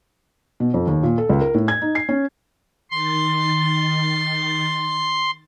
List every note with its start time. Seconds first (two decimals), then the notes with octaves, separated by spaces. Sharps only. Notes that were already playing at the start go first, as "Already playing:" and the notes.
0.60 B2
0.74 F2
0.87 D#2
1.03 A#2
1.18 A4
1.29 C#2
1.41 A#4
1.54 A2
1.68 G#6
1.82 D#4
1.95 C7
2.09 C#4
2.91 D#3 C6 A6